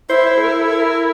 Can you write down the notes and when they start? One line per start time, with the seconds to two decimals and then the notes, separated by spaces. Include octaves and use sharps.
0.09 E4 C5
0.27 C5
0.37 A4
0.44 A#4
0.61 A4
0.78 A#4